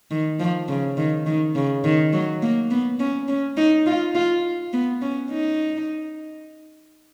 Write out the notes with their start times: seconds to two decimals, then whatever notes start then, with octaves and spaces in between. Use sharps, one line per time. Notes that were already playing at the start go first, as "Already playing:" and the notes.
0.11 D#3
0.39 F3
0.68 C#3
0.97 D#3
1.26 D#3
1.55 C#3
1.84 D#3
2.13 F#3
2.42 A#3
2.71 B3
3.00 C#4
3.28 C#4
3.57 D#4
3.86 F4
4.15 F4
4.73 B3
5.02 C#4
5.31 D#4